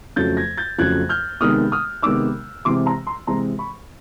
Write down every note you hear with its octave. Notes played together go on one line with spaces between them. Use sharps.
F2 C#3 F#3 A3 G6 A6
G#6 A#6
G6 A6
F2 C#3 F#3 A3 F#6 G#6
F6 G6
C3 D#3 G#3 B3 D#4 D#6 F6
D#6 F6
C3 D#3 G#3 B3 D#4 D6 E6
C3 E3 G#3 C4 C6 D6
A#5 C6
A#5 C6
C3 E3 G#3 C4 A#5 C6
B5 C#6